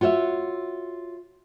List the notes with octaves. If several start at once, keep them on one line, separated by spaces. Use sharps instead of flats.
F4 F#4 C#5 D#5 E5